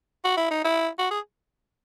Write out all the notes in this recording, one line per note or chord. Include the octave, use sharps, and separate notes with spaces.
F#4
E4
D#4
E4
F#4
G#4